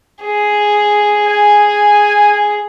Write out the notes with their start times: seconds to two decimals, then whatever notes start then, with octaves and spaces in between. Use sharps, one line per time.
0.24 G#4
1.27 G#5